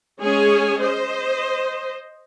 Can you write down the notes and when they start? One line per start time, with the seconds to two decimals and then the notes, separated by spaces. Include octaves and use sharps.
0.21 G#3 C#4 G#4 C#5 G#5
0.82 C5 D#5